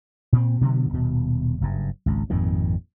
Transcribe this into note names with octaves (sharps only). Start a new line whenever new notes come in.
A#2 C4
B2 D3 F#3 B3
D#1 B2
F#1 G2
G#1 C#2
G#1 F2 A#2 D#3